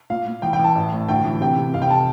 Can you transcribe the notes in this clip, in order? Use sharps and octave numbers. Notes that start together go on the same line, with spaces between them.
A#2 F5
A#2
E3 G5
G5
E3 A5
A1
A2
D2 G5
E3
C3 G5
C3
F1 F5
G5
A5